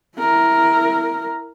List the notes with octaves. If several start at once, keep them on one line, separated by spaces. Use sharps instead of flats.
E4 A#4